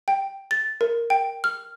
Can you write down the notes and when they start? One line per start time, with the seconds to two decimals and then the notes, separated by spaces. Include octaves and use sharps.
0.08 G5
0.51 A6
0.81 A#4
1.10 G5
1.44 F6